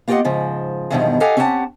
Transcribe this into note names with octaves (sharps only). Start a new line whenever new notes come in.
A#3 F4 G4 A#4 D#5 F#5
G#2 C#3 F3
E2 G2 B2 D#3 F3
G4 A4 D#5 F5 F#5 G#5
C4 C#4 G4 F#5 G5 A5